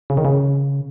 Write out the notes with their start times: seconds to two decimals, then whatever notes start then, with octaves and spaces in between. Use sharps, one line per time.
0.10 C#3
0.17 D#3
0.25 C#3